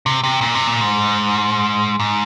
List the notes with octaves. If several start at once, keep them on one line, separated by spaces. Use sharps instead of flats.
C3
C3
A#2
C3
A#2
G#2
G#2